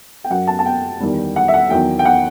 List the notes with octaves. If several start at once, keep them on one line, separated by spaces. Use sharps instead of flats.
G5
F#2 F#3 F#5
A5
A5
G5
E2 D#3 G3
F#5
E5
F#5
E2 D#3 F#3 G5
G5
F#5